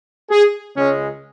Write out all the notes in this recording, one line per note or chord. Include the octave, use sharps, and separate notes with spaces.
G#4
C#2 C#3 G#3 C#4